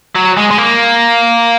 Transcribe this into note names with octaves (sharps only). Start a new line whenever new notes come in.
F#3
G#3
G#3
A#3